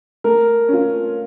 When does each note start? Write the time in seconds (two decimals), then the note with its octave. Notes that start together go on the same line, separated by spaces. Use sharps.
0.24 A3 A#4
0.69 C#4 F4